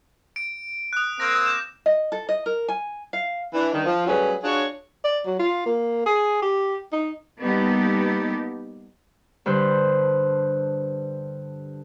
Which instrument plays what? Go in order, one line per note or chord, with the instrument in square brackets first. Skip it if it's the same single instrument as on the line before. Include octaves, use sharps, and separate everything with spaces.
[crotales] D7
D#6 F#6
[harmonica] A#3 C4 [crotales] A#6
[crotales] D6 G6 E7
[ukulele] D#5
A4
D#5
A#4
G#5
F5
[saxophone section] E3 D4
G2 D#3
F3
F#3 G3 A3 C#4 G#4 B4
D4 F4 F#4 G#4 C#5
[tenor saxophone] D5
F#3
F4
A#3
G#4
G4
D#4
[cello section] G3 A#3 B3 D#4 G4 A4
[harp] G2 D3 B4 C5